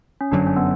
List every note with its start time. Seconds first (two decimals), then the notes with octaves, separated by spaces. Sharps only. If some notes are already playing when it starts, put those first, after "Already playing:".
0.21 C#4
0.31 G1 F#2 D3 F#3 D4
0.47 C#4
0.56 B3